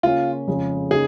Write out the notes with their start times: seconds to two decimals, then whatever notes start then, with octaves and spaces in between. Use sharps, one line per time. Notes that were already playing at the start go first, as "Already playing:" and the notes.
0.03 C#3 A#3 C#4 F4
0.47 F2 C#3 F3 G#3 C#4
0.91 C#3 A#3 D#4 G#4